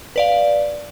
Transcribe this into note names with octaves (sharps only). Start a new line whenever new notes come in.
B4 D5 F5